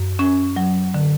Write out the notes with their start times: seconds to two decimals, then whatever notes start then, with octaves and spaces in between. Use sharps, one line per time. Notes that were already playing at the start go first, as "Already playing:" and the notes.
Already playing: F#2
0.19 C#4
0.56 F#3
0.94 D3